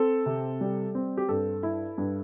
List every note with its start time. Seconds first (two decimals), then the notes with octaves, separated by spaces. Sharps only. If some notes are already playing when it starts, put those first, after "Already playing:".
Already playing: C4 A4
0.26 C3
0.61 G3
0.95 C4
1.17 G4
1.29 G2 A4
1.63 E4
1.98 G2